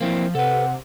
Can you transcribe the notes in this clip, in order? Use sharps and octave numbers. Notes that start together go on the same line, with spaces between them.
F3 A#3 C4 E4
C3 A4 B4 F#5